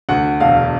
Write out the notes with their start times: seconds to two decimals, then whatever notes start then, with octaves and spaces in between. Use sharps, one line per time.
0.09 D2 F#5
0.40 E1 F5